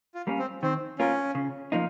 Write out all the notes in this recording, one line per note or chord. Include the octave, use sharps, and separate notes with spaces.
F4
G3 A#3 C#4
C4
D#3 C4
A#3 C#4 F4 A#4
C#3
F3 A#3 D#4